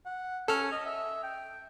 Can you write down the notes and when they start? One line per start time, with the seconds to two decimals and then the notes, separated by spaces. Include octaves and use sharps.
0.06 F#5
0.48 C#4 A4 F6
0.72 D#5
0.85 E5
1.23 G5